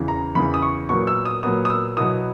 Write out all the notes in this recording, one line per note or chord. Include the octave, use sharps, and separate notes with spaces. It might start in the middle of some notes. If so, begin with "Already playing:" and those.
Already playing: E2 C#3 E3
A#5
E2 C#3 E3 B5
D#6
C#6
A#2 F#3 B3 C#6
E6
D#6
A#2 F#3 B3 D#6
D#6
E6
B2 F#3 B3 E4 D#6